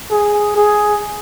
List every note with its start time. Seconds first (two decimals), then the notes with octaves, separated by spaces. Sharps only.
0.11 G#4
0.56 G#4